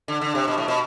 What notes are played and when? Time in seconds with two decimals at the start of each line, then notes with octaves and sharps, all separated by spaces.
0.08 D3
0.21 D3
0.35 C3
0.48 B2
0.58 A2
0.68 B2